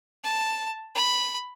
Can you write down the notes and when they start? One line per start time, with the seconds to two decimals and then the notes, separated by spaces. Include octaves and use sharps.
0.24 A5
0.95 B5